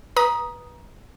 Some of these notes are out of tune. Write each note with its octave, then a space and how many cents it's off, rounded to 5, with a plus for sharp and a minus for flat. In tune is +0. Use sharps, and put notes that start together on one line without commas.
B4 -15 A#5 +20 D#6 +0